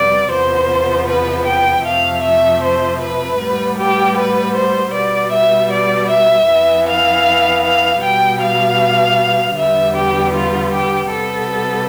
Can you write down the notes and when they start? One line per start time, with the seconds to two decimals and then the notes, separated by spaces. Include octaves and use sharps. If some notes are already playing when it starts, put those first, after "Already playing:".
Already playing: F2 C3 G3 B3 D5
0.31 E2 C3 F3 B3 C5
1.08 B4
1.47 G5
1.85 F2 C3 F3 A3 F5
2.24 E5
2.63 C5
3.02 B4
3.40 A2 G3 B3
3.79 G4
4.17 B4
4.56 C5
4.95 B2 G3 B3 D5
5.33 E5
5.72 D5
6.10 E5
6.49 F2 E3 B3
6.88 F5
7.65 F5
8.03 B2 G3 B3 G5
8.42 F5
9.58 E2 D3 G3 B3 E5
9.97 G4
10.35 F4
10.74 G4
11.12 C3 G3 B3 A4